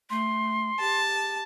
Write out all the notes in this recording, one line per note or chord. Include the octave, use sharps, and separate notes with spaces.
A3 C6
G4 A5